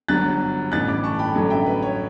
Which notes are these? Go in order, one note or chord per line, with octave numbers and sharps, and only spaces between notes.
G1 G2 F#3 F#6 A6
A1 G2 E3 F#6 A6
B5 D6
A5 C#6
G5 B5
A1 G2 D3 F#3 A3
E5 G5
B4
C#5